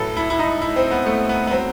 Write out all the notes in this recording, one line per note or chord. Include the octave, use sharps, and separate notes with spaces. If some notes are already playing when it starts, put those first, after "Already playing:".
Already playing: A2 F#3 A4 B4
E4
E4
D#4
E4
C4
B3
A3
B3
B3
F#3 C4